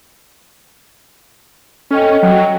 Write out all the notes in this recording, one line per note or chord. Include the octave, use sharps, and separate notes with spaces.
C#4 A4 D#5 G5
F#3